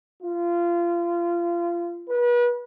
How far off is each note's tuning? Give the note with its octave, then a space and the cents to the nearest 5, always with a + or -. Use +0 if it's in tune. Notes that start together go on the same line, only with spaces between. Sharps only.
F4 -25
B4 -35